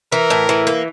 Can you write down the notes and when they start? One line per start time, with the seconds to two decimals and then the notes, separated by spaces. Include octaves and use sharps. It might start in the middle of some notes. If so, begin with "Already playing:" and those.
0.12 E3 A#4
0.30 A2
0.49 E3
0.67 A#3